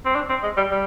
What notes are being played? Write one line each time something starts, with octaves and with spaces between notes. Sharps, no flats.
C4
D4
C4
G#3
G3
G3